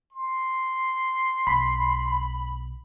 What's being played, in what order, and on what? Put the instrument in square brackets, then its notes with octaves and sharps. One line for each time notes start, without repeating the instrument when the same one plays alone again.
[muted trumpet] C6
[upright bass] B1 [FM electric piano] B5